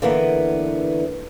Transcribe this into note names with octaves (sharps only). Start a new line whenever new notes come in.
D3 E3 A#3 B3